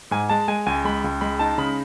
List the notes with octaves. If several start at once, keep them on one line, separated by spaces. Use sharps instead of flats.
G#2 G#5
G#3 A5
G#3 G#5
C#2 G#5
G#3 B5
C#2
G#3 B5
D#4 A5
C#3 B5